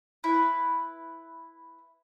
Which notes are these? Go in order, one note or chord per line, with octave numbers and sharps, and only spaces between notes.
E4 B4